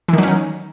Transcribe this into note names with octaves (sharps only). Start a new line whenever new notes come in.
D#3 E3 F#3 C#4 D#4